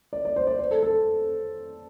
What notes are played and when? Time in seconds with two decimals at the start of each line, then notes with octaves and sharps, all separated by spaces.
0.13 D5
0.25 D5
0.36 C5
0.47 D5
0.59 C5
0.71 A4
0.83 A4